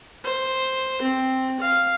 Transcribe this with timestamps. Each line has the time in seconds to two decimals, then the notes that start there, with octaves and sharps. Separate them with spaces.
0.24 C5
1.02 C4
1.60 F5